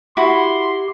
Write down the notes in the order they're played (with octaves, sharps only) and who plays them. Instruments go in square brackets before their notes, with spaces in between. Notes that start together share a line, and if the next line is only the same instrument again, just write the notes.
[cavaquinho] E4 F#4 [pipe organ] G4 [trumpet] C6